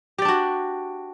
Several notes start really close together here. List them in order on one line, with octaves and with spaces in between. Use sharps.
G4 D5 D4 F#4